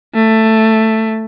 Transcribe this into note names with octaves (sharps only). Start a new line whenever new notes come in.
A3